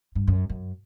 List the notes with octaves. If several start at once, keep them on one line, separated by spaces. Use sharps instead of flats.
G2
F#2
F#2